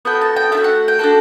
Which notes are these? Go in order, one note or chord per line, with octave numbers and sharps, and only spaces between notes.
B3 F#4 A4 G5
A5
G5
A3 D4 E5
F#4
F#5
G5
D4 F#4 A4